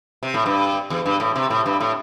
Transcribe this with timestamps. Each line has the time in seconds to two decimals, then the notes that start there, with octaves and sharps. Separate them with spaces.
0.23 C3
0.34 A2
0.46 G2
0.90 E2
1.06 G2
1.20 A2
1.36 C3
1.50 A2
1.66 G2
1.81 A2